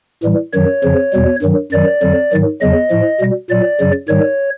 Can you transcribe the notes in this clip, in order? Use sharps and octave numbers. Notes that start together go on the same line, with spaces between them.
A2 E3 G3
F#2 D#3 F#3 C#5
F2 C#3 F3
E2 B2 G3
G2 D#3 F#3
F#2 D#3 F#3 D5
F2 D3 F#3
G#2 D#3 F#3
E2 C#3 F#3 D#5
A2 F3
B2 G3
A#2 F#3 D5
F#2 C#3 F#3
G#2 D#3 G3 C#5